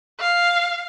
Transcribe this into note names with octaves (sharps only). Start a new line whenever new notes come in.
F5